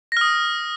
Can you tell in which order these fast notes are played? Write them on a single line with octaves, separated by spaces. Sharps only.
A#6 F6 D#6